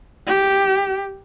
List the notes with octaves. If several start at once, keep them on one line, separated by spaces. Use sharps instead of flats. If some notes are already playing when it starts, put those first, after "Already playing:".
G4